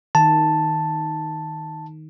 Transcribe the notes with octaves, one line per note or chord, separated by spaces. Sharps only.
D#3 A5